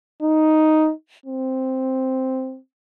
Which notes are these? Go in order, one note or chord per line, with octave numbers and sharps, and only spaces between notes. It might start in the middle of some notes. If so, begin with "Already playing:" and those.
D#4
C4